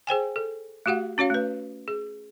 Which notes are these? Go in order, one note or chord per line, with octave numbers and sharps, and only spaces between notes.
G#4 C5 G5 G#5
A4
A3 F#4 G4 F5 F#5
C#4 F#4 C#5 F5
A3 B4
G#4